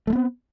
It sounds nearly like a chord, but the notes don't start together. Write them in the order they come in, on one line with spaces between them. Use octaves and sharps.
A3 G#3 B3 C4